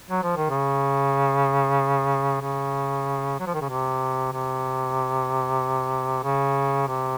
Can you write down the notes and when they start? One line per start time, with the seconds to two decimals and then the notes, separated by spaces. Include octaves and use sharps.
0.10 F#3
0.23 F3
0.36 D#3
0.50 C#3
2.41 C#3
3.40 F#3
3.47 F3
3.54 D#3
3.61 C#3
3.69 C3
4.33 C3
6.23 C#3
6.87 C3